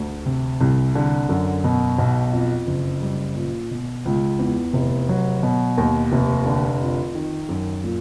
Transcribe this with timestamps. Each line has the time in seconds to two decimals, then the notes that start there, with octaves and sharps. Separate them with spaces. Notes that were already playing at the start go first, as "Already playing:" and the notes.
Already playing: D2 D3
0.26 C3
0.61 C2
0.95 D3
1.29 F#2
1.64 B2
1.98 B1
2.32 F2
2.67 F#1
3.02 G3
3.36 A#2
3.71 B2
4.05 C#2
4.39 E2
4.73 F1
5.09 F#3
5.43 B2
5.78 D#2
6.12 F1
6.45 D3
6.80 F2
7.15 D#3
7.49 F#2
7.84 A#2